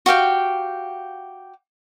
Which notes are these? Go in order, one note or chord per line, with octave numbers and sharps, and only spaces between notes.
F#4 G4 F5 G5